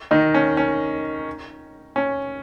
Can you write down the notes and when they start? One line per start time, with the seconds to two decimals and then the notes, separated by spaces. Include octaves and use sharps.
0.11 D#3 D#4
0.34 C#4
0.57 C#4
1.96 C#4